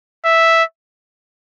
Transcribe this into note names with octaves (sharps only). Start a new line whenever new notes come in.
E5